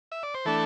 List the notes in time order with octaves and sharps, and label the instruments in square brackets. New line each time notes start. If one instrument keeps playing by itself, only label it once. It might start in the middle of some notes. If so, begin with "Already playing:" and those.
[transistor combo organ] E5
D5
C5
E3 A3 D4 A4